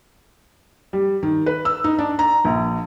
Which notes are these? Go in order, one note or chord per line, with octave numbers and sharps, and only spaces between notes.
G3
D#3
B4
E6
D#4
D4
A#5
A#1